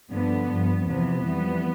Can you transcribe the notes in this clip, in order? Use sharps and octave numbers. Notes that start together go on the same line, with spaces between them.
G2 D3 F3 B3
G2 F3
E2 C3 F3 B3
F2 E3 G3